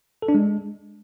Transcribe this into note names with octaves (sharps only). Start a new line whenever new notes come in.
A4
D4
G#3